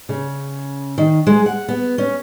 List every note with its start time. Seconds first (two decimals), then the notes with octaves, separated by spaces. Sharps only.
0.09 C#3
0.98 D#3
1.27 G#3
1.46 F#5
1.68 B3
1.98 C#4